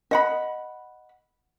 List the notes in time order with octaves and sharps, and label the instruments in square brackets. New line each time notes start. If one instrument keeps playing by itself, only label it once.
[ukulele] D#5 F#5 B5